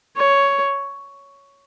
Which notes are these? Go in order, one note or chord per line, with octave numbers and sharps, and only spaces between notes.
C#5